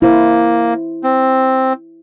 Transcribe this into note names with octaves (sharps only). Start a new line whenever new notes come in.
A#3 E4 C5
C4